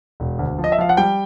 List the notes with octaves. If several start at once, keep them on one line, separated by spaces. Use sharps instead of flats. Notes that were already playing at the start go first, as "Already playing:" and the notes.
E1
D2
F3
D#5
E5
F3 F5
F#5
G3 G5